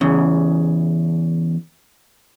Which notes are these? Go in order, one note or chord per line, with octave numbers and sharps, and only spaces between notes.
E2 C#3